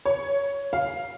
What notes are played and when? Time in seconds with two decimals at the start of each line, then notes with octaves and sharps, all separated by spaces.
0.05 C#5
0.73 F5